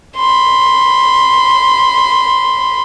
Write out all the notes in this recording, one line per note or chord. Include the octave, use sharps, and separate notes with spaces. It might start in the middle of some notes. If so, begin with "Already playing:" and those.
B5 C6